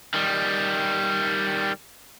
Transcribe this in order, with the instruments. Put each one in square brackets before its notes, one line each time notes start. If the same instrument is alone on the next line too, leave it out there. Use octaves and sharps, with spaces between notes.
[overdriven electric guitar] D#3 G3